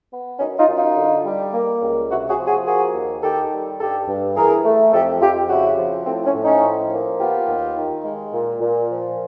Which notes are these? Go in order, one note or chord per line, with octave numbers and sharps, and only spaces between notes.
B3
F#2 C#4 D#4
D#4 F4
F#2
D#4 F4
D3
G3
A#3
C#2
C3 E4 F#4
F#4 G#4
F3
F#4 G#4
A#3 F#4 G#4
D#2
D#3 G4 A4
G3
G2 G4 A4
G2
E3 G#4 A#4
A3
F2 G4 A4
F2 F4 G4
C#3 E4 F#4
F3
A2 C4
C#4
A2
C#4 D#4
F3
A#3
B3 F4 G4
D#2
D#3
G#3
A#2
A#2
F3